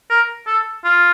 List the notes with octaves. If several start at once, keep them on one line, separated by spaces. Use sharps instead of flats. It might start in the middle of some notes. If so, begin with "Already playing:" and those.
A#4
A4
F4